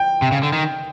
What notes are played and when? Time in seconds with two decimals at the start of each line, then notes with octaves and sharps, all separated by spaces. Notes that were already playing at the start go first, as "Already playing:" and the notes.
Already playing: G5
0.22 C3
0.32 C#3
0.43 D3
0.53 D#3